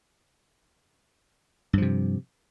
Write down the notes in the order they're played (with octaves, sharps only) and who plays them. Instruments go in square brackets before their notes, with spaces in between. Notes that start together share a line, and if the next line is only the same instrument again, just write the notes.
[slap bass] G2
F3
C3